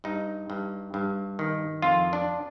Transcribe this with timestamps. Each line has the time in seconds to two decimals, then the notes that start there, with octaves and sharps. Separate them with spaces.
0.04 G2 D#4
0.50 G2
0.94 G2
1.39 D#3
1.82 F2 F4
2.13 D4